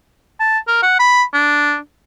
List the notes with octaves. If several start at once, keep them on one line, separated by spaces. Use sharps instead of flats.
A5
A#4
F#5
B5
D4